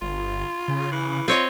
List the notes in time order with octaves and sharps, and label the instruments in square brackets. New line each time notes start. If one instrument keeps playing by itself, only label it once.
[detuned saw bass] G1 [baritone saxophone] F4
[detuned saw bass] C#3
[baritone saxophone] E3
[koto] C4 C#5 D#5 [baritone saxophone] F4